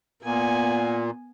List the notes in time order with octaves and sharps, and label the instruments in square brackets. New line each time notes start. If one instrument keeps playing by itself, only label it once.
[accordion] A#2 [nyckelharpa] B3 G#5